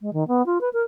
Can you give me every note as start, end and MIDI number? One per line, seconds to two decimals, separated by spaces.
0.01 0.13 56
0.13 0.27 51
0.28 0.45 59
0.46 0.58 65
0.61 0.69 71
0.73 0.82 70